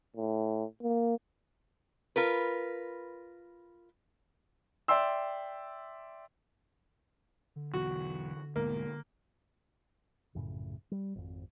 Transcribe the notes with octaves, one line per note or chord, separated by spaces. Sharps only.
A2
A#3
F4 A#4 B4
D5 E5 G5 C6 E6
D3
B1 E2 F#4
D2 G#2 B2 A#3
A#1 F#2 A2 C#3
G3
G#1 F2